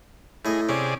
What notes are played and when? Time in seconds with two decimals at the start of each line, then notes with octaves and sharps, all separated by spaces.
0.45 A2 G#4 D#5
0.69 C3 C#4 G#4 D5